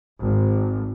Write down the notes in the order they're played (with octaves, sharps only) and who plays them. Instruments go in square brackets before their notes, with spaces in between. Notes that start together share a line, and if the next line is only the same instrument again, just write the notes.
[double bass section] G#1